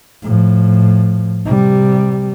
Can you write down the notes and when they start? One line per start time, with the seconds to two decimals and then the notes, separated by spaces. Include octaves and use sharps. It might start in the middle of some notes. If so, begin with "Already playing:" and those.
0.23 A2 F3
1.46 C3 G3